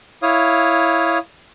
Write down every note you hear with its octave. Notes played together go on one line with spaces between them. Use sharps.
E4 C#5 F5 D#6